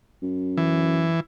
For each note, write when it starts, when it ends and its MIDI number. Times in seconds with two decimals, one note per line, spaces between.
0.22 1.10 42
0.57 1.20 52